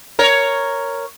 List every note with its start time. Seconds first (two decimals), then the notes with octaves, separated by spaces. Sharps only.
0.19 A#4 C#5